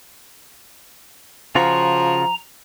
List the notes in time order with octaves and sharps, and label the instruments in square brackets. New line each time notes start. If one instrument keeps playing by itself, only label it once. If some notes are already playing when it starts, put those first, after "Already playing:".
[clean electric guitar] C#3 F4 F#4 [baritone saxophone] F3 [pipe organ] A#5